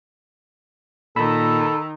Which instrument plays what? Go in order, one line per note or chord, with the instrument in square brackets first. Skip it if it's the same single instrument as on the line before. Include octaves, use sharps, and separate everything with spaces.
[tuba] A#2 [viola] D#3 [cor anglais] A4 [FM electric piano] B5 E6